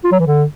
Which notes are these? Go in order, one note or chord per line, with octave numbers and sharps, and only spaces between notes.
F4
F#3
E3
D3